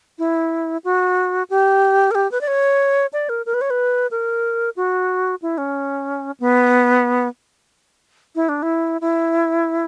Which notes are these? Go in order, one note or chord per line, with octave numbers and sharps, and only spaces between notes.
E4
F#4
G4
A#4
G4
B4
D5
C#5
D5
A#4
A#4
B4
C#5
B4
A#4
F#4
E4
C#4
B3
E4
D4
E4
E4